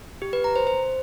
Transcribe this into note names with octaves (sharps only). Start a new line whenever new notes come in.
G4
B4
A#5
C5
C5